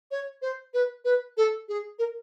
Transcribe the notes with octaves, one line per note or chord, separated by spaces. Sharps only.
C#5
C5
B4
B4
A4
G#4
A#4